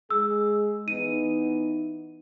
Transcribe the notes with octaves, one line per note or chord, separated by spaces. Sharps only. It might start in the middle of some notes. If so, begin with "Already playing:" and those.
G#3 G#4 E6
E3 B3 D#4 D#7